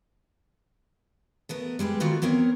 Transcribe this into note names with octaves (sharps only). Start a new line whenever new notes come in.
A3 B3 A#4
G3 G#3 G4 B4
D#3 A#3 F4 F#4 A4
F#3 B3 C4 A#4 C#5